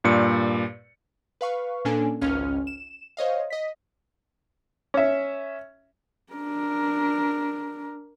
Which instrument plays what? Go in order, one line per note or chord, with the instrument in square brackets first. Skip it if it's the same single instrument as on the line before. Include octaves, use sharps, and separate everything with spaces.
[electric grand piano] G2 A#2 D5 C#7
[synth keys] B4 F5 C#6
A#2 A#3 C#4 D4 A4 G#5
G#1 C#2 C#4 F4 F6
E7
C5 C#5 D#5 F5
D#5 B6
[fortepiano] C#4 E5
[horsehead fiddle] D4 A#4